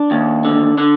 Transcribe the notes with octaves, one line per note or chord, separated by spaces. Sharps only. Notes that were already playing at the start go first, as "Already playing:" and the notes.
Already playing: D4
D#2
D3
D3